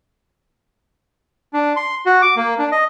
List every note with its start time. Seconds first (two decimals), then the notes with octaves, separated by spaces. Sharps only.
1.53 D4
1.76 C6
2.06 F#4
2.22 D6
2.36 A#3
2.59 D4
2.72 D#5